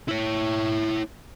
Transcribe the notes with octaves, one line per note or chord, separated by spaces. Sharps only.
E4 C#5